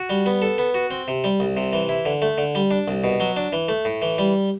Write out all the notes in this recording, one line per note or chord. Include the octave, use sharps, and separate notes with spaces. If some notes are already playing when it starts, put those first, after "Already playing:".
Already playing: F#4
G3
B3
A4
B3
F#4
C4
C3
G3
C2
C3
E3
E4
D3
A3
D3
G3
D4
C2
B2
F#3
D4
E3
A3
A2
E3
G3